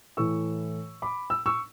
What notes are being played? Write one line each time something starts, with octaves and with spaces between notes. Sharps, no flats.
A2 E3 C#6 E6
B5 D6
E6
C#6 E6